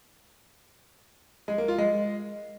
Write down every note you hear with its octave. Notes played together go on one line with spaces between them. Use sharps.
G#3
A#3
F4
G#3